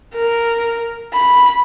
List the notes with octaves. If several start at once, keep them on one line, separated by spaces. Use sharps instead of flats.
A#4
B5